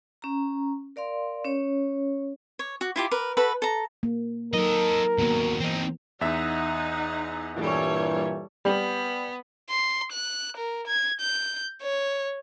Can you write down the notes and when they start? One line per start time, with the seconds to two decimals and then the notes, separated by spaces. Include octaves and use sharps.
0.22 C#4 A#5
0.96 A#4 D5 F5 C6
1.44 C#4 C#5
2.59 C#5
2.81 F#4
2.96 E4 F4 G4
3.11 A#4 B4
3.37 F#4 A4 B4 B5
3.62 A4 A#5
4.03 A#3
4.54 F#3 D#4 A4 A#4 D#5
5.18 D#2 F#3 A#3 B3
5.60 E3 C4 D#4
6.21 E2 D#4 E5 F#5
7.57 G2 A#2 E3 G3 A4 C#5
8.65 G3 B3
9.70 C6
10.12 F#6
10.57 A#4
10.87 G#6
11.20 G6
11.82 C#5